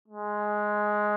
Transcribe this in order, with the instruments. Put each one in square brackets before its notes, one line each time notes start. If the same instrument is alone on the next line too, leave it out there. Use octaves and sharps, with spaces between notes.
[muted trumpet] G#3